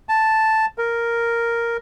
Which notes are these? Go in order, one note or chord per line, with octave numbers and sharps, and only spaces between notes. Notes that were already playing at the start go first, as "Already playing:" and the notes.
A5
A#4